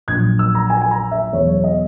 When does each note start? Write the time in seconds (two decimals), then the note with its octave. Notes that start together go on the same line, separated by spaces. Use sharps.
0.08 A#1 A#2 F#3 G#6
0.39 E6
0.55 A#5
0.70 G#5
0.82 G#5
0.91 A#5
1.11 E5
1.32 E2 B2 F#3 C#5
1.49 C#5
1.64 D#5